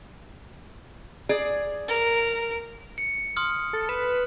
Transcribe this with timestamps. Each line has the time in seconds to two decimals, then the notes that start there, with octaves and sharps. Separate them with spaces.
1.29 G#4 D5
1.88 A#4
2.98 C#7
3.36 C6 D#6 F6
3.73 A4
3.89 B4 E7